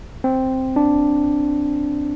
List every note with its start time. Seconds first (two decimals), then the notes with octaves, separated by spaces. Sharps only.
0.24 C4
0.76 D4